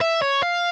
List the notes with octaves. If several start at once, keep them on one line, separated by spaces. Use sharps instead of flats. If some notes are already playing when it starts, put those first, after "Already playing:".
E5
C#5
F5